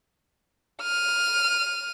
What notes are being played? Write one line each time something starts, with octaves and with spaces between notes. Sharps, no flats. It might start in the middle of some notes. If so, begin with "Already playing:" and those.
F6 D#7